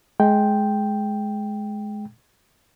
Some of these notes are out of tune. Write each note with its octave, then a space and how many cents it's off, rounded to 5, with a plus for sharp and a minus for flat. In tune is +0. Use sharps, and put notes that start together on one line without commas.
G#3 +20 G5 +0